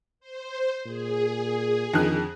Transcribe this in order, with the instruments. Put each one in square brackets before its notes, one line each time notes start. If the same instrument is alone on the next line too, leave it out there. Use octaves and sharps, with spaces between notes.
[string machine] C5
[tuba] A#2 [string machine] G#4
[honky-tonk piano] F2 D3 F#6 [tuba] D#3